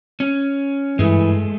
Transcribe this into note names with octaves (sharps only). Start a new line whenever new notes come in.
C#4
G2 E3 G#3 A3